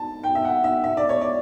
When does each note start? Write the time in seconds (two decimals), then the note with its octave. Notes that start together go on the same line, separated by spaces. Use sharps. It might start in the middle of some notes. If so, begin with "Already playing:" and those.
Already playing: A5
0.23 G5
0.35 E5
0.45 F#5
0.64 E5
0.84 E5
0.97 D5
1.09 C#5
1.21 D5